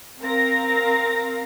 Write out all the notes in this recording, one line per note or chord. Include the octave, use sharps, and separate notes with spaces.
C4 A#4 F5 A#6